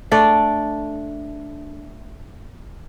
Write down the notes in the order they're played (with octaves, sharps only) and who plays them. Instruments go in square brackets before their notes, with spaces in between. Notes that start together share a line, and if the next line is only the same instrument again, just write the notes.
[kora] A3 D4 D5